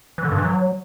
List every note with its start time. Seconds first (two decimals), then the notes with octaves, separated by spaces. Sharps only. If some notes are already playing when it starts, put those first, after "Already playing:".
0.18 E3
0.25 D3
0.31 G2
0.38 E3
0.45 F#3